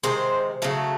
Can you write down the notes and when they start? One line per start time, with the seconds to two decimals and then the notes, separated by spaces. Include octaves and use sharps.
0.03 C3 D#3 G#3 C5
0.62 C#3 F#3 A3